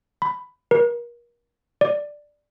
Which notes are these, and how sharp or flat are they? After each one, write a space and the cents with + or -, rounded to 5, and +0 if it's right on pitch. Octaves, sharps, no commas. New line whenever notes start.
B5 +15
A#4 +35
D5 +5